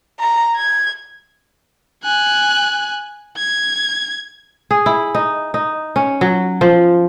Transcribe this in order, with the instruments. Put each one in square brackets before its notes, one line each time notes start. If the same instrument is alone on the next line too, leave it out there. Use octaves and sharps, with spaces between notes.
[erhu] A#5
G#6
[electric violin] G#5 F#6
G#6
[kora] G#4
E4
D#4
D#4
C#4
F#3
F3